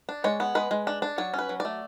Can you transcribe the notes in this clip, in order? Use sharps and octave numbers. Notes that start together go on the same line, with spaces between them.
D4
G#3 C#5
B3
G#3 B4
G#3
D4
D4
F#3 C#5
C#4 B4
F#3
D5
A3